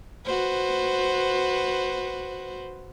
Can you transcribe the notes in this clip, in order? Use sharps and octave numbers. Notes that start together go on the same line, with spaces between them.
F#4 B4 C5